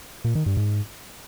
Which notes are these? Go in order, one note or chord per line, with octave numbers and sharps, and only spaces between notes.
A#2
D#3
G2
G#2